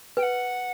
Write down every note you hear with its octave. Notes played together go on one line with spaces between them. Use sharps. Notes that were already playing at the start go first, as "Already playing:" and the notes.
B4 G5
F#5